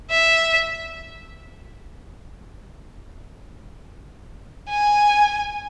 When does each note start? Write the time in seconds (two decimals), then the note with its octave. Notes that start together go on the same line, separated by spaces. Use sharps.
0.10 E5
4.69 G#5